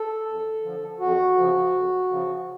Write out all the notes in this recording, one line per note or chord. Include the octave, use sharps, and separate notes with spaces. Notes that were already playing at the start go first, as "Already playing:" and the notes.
Already playing: A4
F2
D3 F3
F2 F#4
C#3 F3
F2
C#3 F3